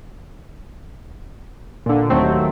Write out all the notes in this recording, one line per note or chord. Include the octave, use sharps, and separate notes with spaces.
A#2 D3
D#2 F#3 A3 C4